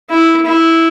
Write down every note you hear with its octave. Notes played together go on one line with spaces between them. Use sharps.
E4
E4